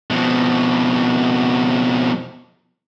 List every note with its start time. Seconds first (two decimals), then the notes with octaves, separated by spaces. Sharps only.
0.10 F2 B2